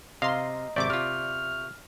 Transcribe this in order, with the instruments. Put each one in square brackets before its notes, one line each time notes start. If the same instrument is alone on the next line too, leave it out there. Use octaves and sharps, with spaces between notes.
[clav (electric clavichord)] C3 [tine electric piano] D#5 A#5 [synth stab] F5 C6
[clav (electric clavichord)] G#1 C3 [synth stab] D5 D6 [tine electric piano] E5 C#6 G6
[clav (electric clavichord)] C3 F4 [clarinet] F6